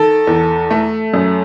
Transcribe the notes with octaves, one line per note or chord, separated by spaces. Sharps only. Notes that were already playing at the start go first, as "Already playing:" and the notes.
Already playing: D#3 A4
E2
A3
F#2